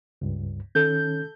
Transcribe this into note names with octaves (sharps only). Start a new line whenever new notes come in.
C#2 G2
D#3 C#4 A4 G6